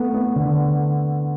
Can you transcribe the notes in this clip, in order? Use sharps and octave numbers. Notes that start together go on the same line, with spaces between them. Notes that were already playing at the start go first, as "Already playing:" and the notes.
Already playing: A3 B3
B3
D3